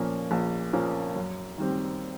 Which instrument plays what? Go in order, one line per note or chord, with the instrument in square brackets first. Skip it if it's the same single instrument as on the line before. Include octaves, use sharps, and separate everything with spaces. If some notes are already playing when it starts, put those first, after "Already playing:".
Already playing: [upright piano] A#2 F3 A#3 C#4
A#1
A#2 F3 A#3 C#4
F#2
D#3 G3 C4